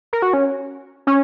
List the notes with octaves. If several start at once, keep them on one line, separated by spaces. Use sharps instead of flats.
A#4
F#4
C#4
C#4